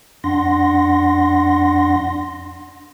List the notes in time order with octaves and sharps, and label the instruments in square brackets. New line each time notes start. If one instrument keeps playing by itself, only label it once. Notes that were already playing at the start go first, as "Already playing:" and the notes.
[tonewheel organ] F2 D4 F#5 C6 A#6